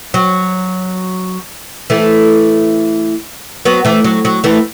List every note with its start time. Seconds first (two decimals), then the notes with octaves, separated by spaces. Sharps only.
0.14 F#3
1.90 E3 A3
3.65 F#3 B3
3.85 E3 A3
4.04 F#3
4.25 F#3
4.44 E3 A3